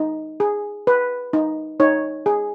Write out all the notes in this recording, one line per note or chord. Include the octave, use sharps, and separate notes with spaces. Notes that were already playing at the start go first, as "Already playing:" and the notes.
Already playing: D#4
G#4
B4
D#4
D#4 C#5
G#4